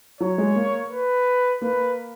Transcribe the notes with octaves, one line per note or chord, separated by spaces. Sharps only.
F#3 C#5
G#3
A#3
B4
A#3 B4